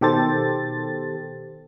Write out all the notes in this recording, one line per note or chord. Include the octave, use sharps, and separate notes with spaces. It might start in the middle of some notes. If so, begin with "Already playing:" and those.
B2 D#3 G4 A4 C5 A6